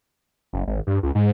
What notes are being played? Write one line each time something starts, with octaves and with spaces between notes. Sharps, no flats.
F#1
G#1
G2
C#2
G#2